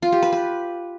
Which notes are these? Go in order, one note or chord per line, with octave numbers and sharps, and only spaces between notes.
F4
G4
B4
B4